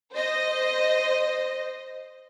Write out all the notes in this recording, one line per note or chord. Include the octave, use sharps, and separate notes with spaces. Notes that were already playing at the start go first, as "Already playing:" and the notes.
C5 D#5